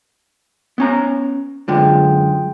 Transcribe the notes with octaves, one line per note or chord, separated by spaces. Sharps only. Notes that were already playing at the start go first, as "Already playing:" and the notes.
B3 C#4 A#5
F#2 D3 G#3 F4 G#4 G5